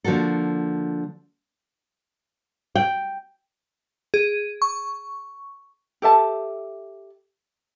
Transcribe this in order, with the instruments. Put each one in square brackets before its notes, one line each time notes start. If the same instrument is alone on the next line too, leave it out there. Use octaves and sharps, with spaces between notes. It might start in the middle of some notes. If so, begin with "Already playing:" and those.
[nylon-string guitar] D3 F3 A#3 F#4 A4
[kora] G5
[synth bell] G#4
C#6
[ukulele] G4 A4 E5 A5